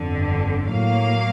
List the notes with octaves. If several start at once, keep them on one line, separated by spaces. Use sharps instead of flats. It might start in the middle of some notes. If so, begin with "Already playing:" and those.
Already playing: G1 F2 D3
A2 F#3 A#3 F5